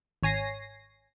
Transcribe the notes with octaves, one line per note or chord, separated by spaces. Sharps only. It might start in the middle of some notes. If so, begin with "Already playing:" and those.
G#1 C#5 G#5 A#6 C7